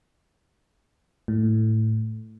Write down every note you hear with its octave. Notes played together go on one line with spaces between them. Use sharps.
A2